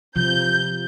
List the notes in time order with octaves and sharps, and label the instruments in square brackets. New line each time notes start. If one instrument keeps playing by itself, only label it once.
[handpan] C3 F3 [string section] G6